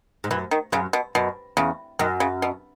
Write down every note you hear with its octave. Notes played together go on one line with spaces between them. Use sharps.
G#2
F#2 E3
D#3
F#2 C#3
B2
F#2 B2
E2 C#3
F#2 D#3
C#3
B2